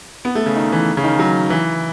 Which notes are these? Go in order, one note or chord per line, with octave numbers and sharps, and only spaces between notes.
B3
A3
C#3
D#3
E3
C#3
D#3
F#3
E3